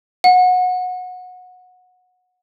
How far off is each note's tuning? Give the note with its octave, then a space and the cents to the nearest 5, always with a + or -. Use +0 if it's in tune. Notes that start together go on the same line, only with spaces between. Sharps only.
F#5 -20